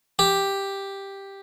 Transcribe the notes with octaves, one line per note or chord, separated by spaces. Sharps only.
G4